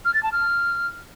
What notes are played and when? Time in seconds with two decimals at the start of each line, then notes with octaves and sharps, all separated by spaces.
0.05 F6
0.14 A6
0.23 A5
0.32 F6